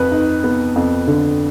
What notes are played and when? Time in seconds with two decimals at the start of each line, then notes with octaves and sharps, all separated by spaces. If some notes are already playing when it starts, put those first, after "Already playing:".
Already playing: F2 B4
0.12 D#4
0.44 B3
0.76 F2
1.07 D3